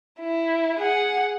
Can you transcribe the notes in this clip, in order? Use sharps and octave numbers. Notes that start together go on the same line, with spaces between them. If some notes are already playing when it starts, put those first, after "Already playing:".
E4
G#4 F#5